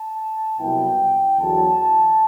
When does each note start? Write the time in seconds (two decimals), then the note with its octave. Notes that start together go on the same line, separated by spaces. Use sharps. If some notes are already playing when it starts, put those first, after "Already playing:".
Already playing: A5
0.58 C2 B2 F#3 B3 E4 G5
1.37 E2 D3 F#3 A5